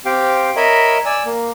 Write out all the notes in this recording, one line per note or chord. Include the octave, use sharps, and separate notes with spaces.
C4 G4 F5 G5
A#4 C#5 D#5 E5 B5
D5 G#5 E6
A#3